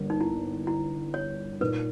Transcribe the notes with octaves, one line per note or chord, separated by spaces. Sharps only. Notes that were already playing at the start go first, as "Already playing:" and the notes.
Already playing: G1 G2 G3 A#3
D#4
E4
E4
C#5
A#2 A#3 D#4 B4